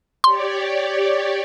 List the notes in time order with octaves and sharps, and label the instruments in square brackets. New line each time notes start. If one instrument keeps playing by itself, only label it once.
[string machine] G4 C#5 D5 [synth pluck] C6